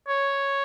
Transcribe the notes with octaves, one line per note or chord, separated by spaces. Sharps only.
C#5